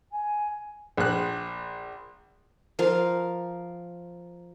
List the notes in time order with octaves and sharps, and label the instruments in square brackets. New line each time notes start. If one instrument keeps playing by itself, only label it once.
[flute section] G#5
[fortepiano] A#1 F#6
[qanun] F3 A#4 F5